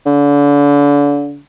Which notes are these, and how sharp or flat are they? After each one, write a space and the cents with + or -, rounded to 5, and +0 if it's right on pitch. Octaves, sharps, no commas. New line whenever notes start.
D3 -35